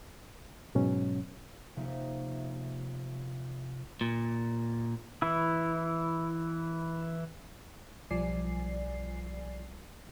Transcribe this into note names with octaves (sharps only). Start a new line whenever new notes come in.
G#2 B2 F#3 C#4
F1 C3 A#3 D#4 E5
A#2
E3 E4
B1 F3 G3 D5 G#5 C7